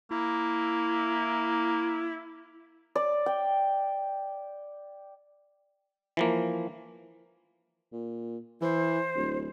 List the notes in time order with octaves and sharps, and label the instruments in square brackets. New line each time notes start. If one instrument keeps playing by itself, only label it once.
[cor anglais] A#3 [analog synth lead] E4
[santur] D5
G5
[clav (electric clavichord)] E3 F3 A#3
[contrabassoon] A#2
[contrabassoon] E3 [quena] C5
[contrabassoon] D1